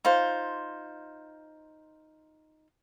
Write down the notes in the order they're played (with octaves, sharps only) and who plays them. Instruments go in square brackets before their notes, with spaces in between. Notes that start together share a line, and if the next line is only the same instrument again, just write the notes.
[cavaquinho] D#4 F4 C5